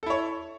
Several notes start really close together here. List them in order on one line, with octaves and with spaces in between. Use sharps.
A4 E4 C#5